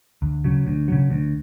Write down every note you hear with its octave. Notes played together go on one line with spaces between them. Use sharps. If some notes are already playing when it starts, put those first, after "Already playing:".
D2
C#3 F#3
D2
C#3 F#3
D2